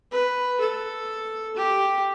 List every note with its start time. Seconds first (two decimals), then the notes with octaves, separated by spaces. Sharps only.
0.11 B4
0.60 A4
1.56 G4